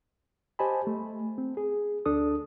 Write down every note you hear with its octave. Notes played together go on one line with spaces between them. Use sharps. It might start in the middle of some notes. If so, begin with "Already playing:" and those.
G4 C5 D#5 G#5 A5 B5
A3
C4
G#4
D2 D4 A4 D#6